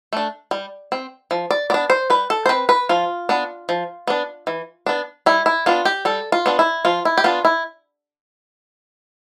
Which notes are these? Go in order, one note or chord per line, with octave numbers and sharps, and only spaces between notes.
A3 D4
G3
C4
F3
D5
B3 D4 D5
C5
G3 B4
A4
C5
C4 B4
B4
F3 F4
B3 D4
F3
B3 D4
E3
B3 D4
G3 E4
E4
B3 D4 F4
G4
G3 A4
F4
B3 D4
E4
F3 F4
E4
G4
B3 D4 F4
E4